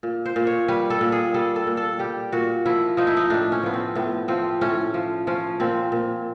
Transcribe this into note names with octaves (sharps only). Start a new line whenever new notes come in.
A#2
C5
A#2
C#5
G3 B4
A4
A#2
G#4
G3 A4
A4
A#2
A4
G3 G4
A#2 F#4
F3 E4
F3 D#4
E4
D#4
A2 D4
C#4
F3 B3
C4
A2 B3
F3 C4
A2 C#4
F3
F3 C#4
A#2 C4
A#2